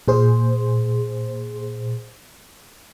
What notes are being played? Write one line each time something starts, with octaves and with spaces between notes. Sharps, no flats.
A#2 G#4 C5